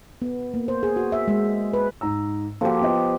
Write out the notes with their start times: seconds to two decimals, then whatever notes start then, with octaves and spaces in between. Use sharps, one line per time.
0.22 B3
0.54 A#3
0.68 C5
0.83 G#4
0.96 F#4
1.12 E5
1.28 G#3
1.74 B4
2.01 G#2 A#5 E6
2.61 F3 A#3 F#4 G4 A4
2.81 B3 F4 D#5